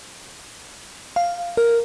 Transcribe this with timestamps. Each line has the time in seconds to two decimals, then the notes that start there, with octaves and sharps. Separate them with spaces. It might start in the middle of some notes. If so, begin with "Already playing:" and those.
1.16 F5
1.57 A#4